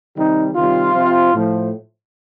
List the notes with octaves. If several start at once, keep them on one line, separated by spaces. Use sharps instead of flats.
C3 D#3 G3 D#4
C3 D#3 G3 F4
C3 F3
A2 F3